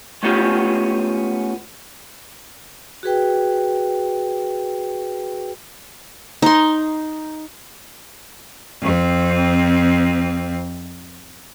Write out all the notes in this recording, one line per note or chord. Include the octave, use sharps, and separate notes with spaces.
G#3 A3 B3 C#4 F4 G4
F#4 G#4 B4 G5
D#4 C6
F2 C4